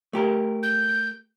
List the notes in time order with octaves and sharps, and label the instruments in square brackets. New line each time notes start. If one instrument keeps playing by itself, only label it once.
[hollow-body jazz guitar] A3 G4 A#4
[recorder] G6